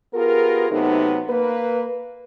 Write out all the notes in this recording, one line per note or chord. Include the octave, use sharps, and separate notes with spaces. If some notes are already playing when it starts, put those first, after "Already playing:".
B3 F4 G4 G#4 A#4
C3 F#3 A3 B3 D#4
A#3 B4